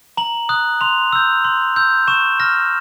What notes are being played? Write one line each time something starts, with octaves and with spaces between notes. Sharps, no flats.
A#5 F#7
D#6 F#6
C6 F7
E6 G6
C6
E6 G6
C#6 E7
F6 A#6